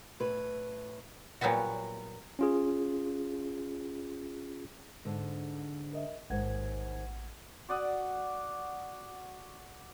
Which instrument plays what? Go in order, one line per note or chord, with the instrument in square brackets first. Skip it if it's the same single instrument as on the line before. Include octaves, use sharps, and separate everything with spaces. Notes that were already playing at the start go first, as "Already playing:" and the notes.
[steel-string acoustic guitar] A2 B4
[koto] A#2 F#3 G3 B3 F#4
[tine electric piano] C#4 F4 G#4
[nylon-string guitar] G#2 D3
[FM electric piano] A#4 D#5 E5
[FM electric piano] A1 F#5 G#6 [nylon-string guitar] D#2 G#2
[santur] F#4 D5 F#5 D#6